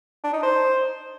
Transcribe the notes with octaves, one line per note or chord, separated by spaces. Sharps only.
D4
D#4
C5